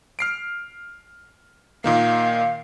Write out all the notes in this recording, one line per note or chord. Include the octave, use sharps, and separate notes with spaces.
F6 C7 D7
A#2 D#3 A#3 F5